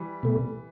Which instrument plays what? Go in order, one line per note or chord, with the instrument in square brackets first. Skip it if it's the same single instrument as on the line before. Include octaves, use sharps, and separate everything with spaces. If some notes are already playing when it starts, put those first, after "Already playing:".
Already playing: [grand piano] E3 G3
[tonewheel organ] B2 A3